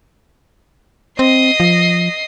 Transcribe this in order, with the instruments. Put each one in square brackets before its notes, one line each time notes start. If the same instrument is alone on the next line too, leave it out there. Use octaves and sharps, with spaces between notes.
[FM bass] C4 [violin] D#5 C7
[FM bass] F3